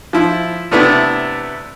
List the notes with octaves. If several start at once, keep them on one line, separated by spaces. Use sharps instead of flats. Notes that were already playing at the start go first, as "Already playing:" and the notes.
F3 E4
C3 A3 B3 D4 E4